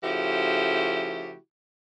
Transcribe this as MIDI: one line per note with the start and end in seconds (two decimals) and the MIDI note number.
0.04 1.36 49
0.04 1.36 53
0.04 1.36 57
0.04 1.36 64
0.04 1.36 66
0.04 1.36 67